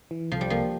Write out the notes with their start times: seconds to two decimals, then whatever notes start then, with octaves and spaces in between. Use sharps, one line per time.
0.11 E3
0.32 C2 F3
0.41 G3
0.50 F3 A#3